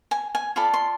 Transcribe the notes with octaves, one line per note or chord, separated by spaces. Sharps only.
G#5
G#5
F4 A4 D5 B5
C6